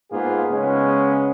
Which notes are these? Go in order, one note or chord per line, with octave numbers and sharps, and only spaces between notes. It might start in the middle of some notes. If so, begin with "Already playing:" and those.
G#2 A#3 B3 F4 G#4
C#3 G#3 B3 C#4